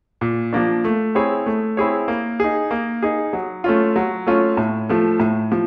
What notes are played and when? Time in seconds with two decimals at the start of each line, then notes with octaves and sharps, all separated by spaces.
0.21 A#2
0.53 F3 A#3 D4
0.85 A3
1.15 C4 E4 G#4 C#5
1.46 A3
1.77 C4 E4 G#4 C#5
2.08 A#3
2.40 D#4 G#4
2.71 A#3
3.02 D#4 G#4
3.33 F#3
3.64 A3 C#4 F4
3.96 F#3
4.27 A3 C#4 F4
4.57 A2
4.89 F3 A3
5.20 A2
5.52 F3